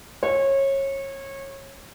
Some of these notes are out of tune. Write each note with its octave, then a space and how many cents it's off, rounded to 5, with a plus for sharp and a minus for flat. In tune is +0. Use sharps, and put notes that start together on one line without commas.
C#5 -25